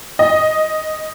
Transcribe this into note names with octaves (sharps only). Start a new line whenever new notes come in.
D#5